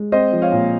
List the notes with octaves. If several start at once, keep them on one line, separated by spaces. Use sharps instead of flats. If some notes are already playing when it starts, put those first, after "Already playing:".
Already playing: G#3
C4 C5 D#5
F3
C#5 F5
A#2